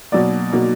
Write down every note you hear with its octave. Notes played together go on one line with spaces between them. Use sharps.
B2 F#3 A#3 D5
B2 F#3 A#3